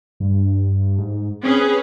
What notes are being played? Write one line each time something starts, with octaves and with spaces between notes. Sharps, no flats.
G2
G#2
C4 C#4 G#4 B4